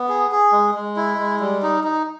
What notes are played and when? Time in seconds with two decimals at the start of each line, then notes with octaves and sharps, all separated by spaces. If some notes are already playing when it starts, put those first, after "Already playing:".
Already playing: B3
0.09 G#4
0.31 G#4
0.52 G#3
0.75 G#3
0.96 E4
1.19 G#3
1.40 G3
1.63 D#4
1.84 D#4